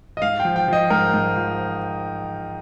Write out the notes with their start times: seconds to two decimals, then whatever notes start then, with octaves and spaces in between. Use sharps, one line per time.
0.17 D#5
0.22 G#2 F5
0.40 G5
0.45 F3
0.56 G5
0.68 F3 D#5
0.90 G#2 A#4
1.14 G#2
1.36 F3